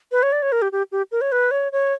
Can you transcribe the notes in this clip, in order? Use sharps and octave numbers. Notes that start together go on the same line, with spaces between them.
B4
C#5
D5
C#5
A#4
G4
G4
G4
A#4
C#5
B4
C#5
C#5